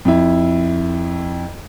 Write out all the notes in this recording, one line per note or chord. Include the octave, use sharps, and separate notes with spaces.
F2 E4